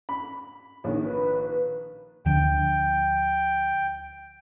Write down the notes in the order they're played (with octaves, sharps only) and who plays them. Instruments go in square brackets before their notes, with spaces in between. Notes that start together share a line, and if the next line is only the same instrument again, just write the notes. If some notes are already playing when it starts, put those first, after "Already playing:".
[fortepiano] B5
[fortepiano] A#1 D#3 [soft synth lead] C#4
[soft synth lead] B4
[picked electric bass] D2 D3 F3 [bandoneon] G5